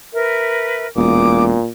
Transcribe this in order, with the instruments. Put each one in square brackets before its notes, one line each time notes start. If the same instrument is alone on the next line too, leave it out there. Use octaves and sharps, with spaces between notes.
[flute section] A#4 B4 E5
[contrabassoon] E1 [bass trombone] A#2 [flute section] D6 D#6